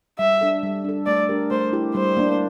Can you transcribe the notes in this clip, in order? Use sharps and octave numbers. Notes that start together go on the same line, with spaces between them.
G3 E5
D4 A4
G3
D4 A4
A3 D5
D4 G4 A#4
A3 C5
E4 G4
G3 C5
A#3 D4